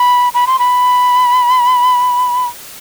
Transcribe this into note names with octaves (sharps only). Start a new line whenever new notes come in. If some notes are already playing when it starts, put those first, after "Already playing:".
Already playing: B5
B5
C6
B5